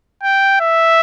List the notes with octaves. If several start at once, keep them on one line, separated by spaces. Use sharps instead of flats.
G5
E5